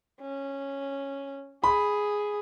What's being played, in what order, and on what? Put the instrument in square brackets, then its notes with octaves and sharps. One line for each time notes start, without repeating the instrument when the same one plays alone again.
[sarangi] C#4
[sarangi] G#4 [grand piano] B5